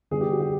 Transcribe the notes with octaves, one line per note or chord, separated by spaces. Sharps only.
D3 G3 B3 G#4
G4
F#4
G4